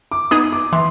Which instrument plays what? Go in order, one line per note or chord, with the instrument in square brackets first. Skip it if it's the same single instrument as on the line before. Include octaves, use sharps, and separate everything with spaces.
[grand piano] D6
[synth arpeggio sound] B3 D#4 G#4 [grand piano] D#6
[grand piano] D6
[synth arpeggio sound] E3 [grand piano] C6